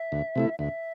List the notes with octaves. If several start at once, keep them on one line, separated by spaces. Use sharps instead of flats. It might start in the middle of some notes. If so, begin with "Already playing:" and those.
Already playing: E5
D2
C3 A3 E4
D2 E5